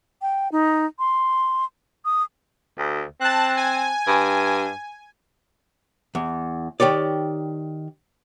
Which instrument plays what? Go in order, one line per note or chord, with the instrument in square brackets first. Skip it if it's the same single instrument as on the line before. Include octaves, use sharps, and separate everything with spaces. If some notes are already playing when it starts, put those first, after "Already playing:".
[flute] G5
D#4
C6
D#6
[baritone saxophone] D2
[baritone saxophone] C4 [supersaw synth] A5 F#6
[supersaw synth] G#5
[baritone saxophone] G2
[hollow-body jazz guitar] E2
D#3 G4 C#5 D5